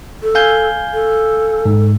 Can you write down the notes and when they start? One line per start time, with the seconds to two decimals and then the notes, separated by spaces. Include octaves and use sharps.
0.23 A4
0.35 F5 G#5 G6
0.94 A4
1.66 G#2